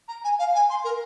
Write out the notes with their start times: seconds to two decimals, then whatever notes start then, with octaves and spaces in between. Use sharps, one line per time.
0.08 A#5
0.24 G#5
0.39 F5
0.54 G#5
0.70 C6
0.84 A#4